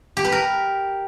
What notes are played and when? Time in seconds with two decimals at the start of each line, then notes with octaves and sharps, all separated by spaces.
0.17 G4
0.24 B4
0.32 A#4